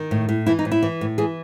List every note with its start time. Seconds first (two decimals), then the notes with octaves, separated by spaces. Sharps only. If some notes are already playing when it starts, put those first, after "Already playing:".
Already playing: D#3
0.11 A2
0.29 A2
0.46 E3 E4
0.59 D#4
0.65 A2
0.71 E4
0.83 E3
1.01 A2
1.18 E3 G#4